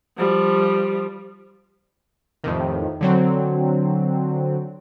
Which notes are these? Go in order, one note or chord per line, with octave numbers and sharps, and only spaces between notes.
F3 G3
F2 A2 C3 D#3
D3 F#3 C4